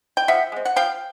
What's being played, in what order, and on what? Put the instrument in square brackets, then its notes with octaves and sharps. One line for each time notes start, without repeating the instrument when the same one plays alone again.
[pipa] G5
F3 E5 F#5
G#3 C4
F#5
F3 F5 G5